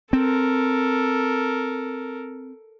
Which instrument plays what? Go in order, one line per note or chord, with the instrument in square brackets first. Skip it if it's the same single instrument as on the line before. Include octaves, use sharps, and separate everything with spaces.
[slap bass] C4 [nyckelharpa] A4 A#4